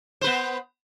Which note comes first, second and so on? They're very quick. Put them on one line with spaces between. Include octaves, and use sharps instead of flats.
C5 B4 B3